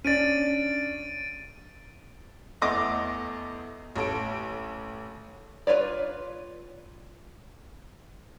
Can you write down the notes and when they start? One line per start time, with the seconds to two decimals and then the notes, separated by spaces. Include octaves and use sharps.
0.05 C#4 D4 A6 D7 D#7
2.62 E2 A3 B3 D#5 D6 A#6
3.96 A1 A4 D7
5.67 F4 B4 C#5 D5